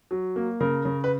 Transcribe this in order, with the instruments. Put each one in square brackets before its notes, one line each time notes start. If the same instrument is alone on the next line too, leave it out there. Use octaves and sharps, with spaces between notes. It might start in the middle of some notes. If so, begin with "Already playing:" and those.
[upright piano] F#3
A#3
C#3 A#4
C#3
B4